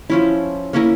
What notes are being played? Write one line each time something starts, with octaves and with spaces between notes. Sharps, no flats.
F3 C#4 E4
A#3 C#4 E4 A#4